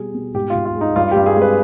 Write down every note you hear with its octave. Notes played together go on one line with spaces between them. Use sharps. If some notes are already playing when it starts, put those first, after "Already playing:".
Already playing: B2 G3 G#4
B2
G#2 G4
G#2 F4
F4
G#3
D#4
G2 F4
G2 G4
G#4
G#3
B4